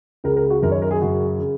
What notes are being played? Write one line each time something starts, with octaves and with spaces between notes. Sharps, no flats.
C#2 C#3 A#4
A#4
F#4
F#2 D#3 A#4
C#5
A#4
G#4
F#2 C#3 F#4
C#3